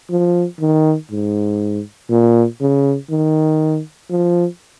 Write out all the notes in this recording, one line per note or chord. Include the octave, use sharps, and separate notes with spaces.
F3
D#3
G#2
A#2
C#3
D#3
F3